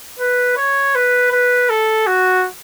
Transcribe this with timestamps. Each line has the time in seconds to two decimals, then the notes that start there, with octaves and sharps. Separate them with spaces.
0.19 B4
0.57 C#5
0.95 B4
1.32 B4
1.70 A4
2.07 F#4